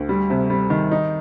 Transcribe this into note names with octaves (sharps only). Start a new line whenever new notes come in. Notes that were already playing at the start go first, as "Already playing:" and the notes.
Already playing: D2
G3
C3
G3
D#3
D#4